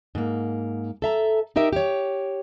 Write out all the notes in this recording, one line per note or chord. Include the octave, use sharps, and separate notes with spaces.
G#2 A#3
A4 E5 A#5
D#4 G4 A#4 E5
G4 C#5